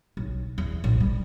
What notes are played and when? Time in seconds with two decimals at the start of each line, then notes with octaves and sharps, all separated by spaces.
0.17 B1
0.58 E2
0.84 A#1
1.01 G3